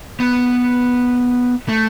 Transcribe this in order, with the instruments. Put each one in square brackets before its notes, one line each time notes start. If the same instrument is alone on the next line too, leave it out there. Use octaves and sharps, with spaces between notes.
[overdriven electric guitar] B3
A3